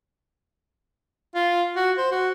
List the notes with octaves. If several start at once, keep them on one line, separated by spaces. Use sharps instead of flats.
F4
F#4
C5
F#4